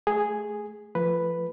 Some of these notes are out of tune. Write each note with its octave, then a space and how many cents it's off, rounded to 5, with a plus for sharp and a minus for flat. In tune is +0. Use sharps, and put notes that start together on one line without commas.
A3 -20 G#4 +0
F3 -25 A3 +0 B4 +0